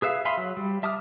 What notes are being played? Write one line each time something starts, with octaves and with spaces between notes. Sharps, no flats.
G#4 B4 E5 F5
E5 F5 G#5 B5 C6
F#3
G3
E5 A5 D6 D#6 F6